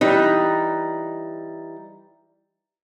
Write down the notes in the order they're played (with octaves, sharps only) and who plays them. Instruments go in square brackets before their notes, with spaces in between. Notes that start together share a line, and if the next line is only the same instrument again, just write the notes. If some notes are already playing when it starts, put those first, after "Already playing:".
[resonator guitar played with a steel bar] E3 G3 D#4